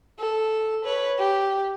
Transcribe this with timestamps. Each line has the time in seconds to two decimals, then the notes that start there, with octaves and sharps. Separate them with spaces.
0.19 A4
0.85 B4 C#5
1.19 G4